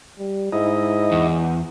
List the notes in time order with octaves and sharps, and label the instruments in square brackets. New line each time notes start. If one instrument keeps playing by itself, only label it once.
[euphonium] G3
[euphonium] G#2 [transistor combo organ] E4 D#5
[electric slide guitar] E2